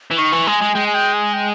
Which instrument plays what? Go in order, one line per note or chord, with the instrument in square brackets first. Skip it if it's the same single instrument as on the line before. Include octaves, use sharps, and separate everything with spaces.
[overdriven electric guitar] E3
[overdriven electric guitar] D#3 [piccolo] C#6
[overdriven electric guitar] E3
[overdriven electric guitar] G#3 [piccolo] G#5
[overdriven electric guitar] G#3
[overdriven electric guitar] G#3 [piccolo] G5
[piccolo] G#5
G5
G#5
G5